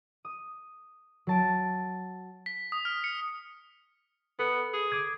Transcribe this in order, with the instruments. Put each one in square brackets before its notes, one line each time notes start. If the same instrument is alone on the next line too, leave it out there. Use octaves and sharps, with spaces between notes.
[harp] D#6
F#3 A5 D7
[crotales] B6
D#6
F6
C#7
[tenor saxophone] B3 [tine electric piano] A4
[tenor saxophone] G#4
[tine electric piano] D6 D#6 G#6